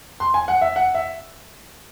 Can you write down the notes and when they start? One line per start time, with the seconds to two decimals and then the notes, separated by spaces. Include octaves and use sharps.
0.20 C6
0.34 G#5
0.48 F#5
0.62 E5
0.76 F#5
0.95 E5